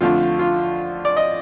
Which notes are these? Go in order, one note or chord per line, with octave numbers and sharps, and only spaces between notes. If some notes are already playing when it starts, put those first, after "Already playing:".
F2 D3 A3 D4 F4
F4
D5
D#5